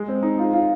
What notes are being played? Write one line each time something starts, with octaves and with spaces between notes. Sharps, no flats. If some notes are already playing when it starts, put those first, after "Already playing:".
Already playing: G#3
C4
D#4
F4
F4